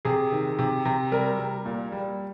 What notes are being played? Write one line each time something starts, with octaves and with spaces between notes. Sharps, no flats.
C3 G#4
D#3
C3
C3
G3 A#4
G3
A#2
G3